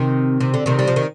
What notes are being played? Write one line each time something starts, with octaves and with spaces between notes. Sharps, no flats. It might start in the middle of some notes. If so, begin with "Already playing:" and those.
Already playing: C3 D#3
C3
D3
C3 D#3
G3
F3
D#3